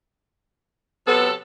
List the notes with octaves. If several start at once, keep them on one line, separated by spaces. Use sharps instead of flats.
C3 F#3 B3 A4